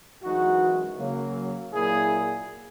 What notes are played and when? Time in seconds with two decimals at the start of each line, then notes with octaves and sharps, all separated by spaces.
0.22 F#2 E3 G#3 D#4 F#4
0.98 C#3 F#3 A#3
1.73 A#2 F#3 A#3 E4 G#4